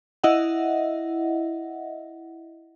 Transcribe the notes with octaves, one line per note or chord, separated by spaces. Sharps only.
E4 D#5 E5 F#5